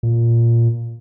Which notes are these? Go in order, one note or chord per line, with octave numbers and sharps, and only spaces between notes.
A#2